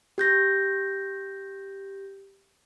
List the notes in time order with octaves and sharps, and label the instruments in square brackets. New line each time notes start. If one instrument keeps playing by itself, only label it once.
[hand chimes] G4 G6 A#6